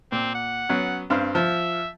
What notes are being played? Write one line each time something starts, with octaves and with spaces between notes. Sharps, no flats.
A#2 C4
F#5
F#3 B3 C#4
G2 C4 F5
F3 E5